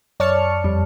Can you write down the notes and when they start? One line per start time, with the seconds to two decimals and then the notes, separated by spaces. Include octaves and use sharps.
0.20 F#2 C#5 D5 A5 F6 C#7
0.64 F2 G3